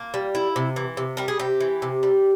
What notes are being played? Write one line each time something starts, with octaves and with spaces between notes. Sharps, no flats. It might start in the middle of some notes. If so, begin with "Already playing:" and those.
Already playing: A#3 F4
G3
E4
C3
E3
C3
G3 A#4
G#4
C3 G4
E3
C3
G3